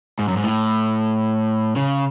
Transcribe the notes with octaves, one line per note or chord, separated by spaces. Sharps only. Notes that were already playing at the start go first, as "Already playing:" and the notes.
G#2
F#2
G#2
A2
C#3